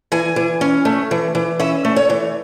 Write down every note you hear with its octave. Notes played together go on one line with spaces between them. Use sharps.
E3 G#5
E3
C#4
A3
E3
E3
C#4 E5
A3
C#5
E3